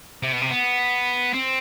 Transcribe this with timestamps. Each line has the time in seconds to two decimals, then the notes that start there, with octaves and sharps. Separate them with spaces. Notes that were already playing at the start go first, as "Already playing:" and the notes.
0.23 C3
0.32 B2
0.41 C3
0.51 B3
1.34 C4